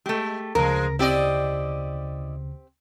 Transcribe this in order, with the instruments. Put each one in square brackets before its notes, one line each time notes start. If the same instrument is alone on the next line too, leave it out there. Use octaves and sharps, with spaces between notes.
[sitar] G#3 [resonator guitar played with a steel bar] A3 G4
[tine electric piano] D2 C#3 [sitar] F3 G#3 [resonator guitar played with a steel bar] A#4
[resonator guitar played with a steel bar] C4 G4 [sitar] E4 D5 D#5